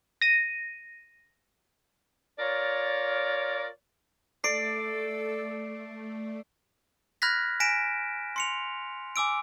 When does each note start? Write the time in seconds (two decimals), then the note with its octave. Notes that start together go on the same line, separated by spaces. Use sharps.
0.22 A#6 D#7
2.39 F4 A#4 C#5 D5
4.44 A3 A4 D5 C7 D7
7.22 B5 F6 F#6 G#6 A#6 B6
7.60 G#5 A#6 B6 D7 E7
8.36 C6 C#7 F7
9.16 G#5 D6 E6 D7